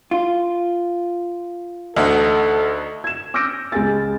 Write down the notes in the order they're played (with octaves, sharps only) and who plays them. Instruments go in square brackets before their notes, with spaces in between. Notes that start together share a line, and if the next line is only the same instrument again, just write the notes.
[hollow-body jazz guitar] F4
[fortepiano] D2 [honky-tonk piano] D#4 E5 F#5 [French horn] A4
[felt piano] G#6 E7
D6 E6 F6 G6 A#6 D7
C#2 G#3 G#5 A6